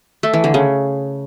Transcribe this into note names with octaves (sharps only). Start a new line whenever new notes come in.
A3
E3
D3
C#3